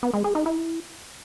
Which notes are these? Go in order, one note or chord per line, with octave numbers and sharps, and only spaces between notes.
B3
G#3
G#4
D#4
E4